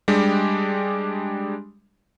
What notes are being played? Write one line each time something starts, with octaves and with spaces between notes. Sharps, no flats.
G3 G#3 D4 G4